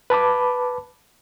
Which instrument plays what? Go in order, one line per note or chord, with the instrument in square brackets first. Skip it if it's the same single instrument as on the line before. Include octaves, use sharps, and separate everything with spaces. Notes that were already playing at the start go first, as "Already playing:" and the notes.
[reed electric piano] B4 A5 B5 D6